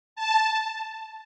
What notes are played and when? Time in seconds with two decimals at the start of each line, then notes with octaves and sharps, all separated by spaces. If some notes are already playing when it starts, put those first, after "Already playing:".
0.16 A5